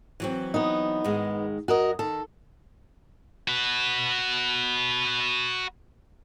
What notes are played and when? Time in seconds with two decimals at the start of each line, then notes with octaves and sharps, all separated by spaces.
0.20 E3 F#3 C4
0.54 B3 D#4
1.04 G#2 D#3 G#3
1.68 F#2 F#4 A#4 D#5
1.99 D#3 A4
3.48 F#4 B4